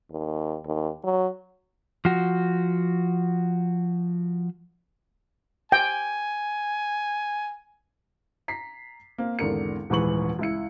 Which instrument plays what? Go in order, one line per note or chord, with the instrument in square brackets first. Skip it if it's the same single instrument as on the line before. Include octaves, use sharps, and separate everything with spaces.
[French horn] D#2
D#2
F#3
[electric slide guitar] F3 F#4
[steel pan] G5 [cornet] G#5
[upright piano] A#5 B6 C7
A#3 C4
G#1 E2 D3 A#4 C#7
D#1 G#2 E3 B4 C#6 F#7
C#2 E4 C#7